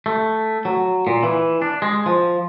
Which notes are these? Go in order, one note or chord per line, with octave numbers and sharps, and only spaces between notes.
A3
F#3
A#2
E3
D4
G#3
F3